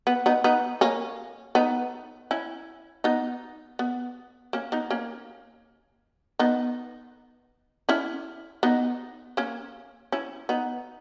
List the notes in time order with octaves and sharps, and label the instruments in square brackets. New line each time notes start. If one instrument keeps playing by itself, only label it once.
[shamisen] B3
B3 D#4
B3 D#4
A#3 C#4
B3 D#4
C#4 E4
B3 D#4
B3
A#3 C#4
B3 D#4
A#3 C#4
B3 D#4
C#4 E4
B3 D#4
A#3 C#4
C#4 E4
B3 D#4